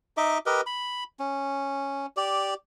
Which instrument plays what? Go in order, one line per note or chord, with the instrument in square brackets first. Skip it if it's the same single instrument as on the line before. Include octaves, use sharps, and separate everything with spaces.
[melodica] D#4 D#5 E5 D6
G4 A#4 B4 D#5
B5
C#4
G4 D5